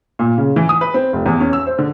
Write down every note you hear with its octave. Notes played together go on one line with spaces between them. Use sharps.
A#2
C#3
E3
D#6
B4
C4
F1
E2
C#4
E6
C5
D3